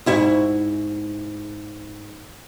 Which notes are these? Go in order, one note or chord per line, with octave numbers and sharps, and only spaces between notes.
G#2 E4 F#4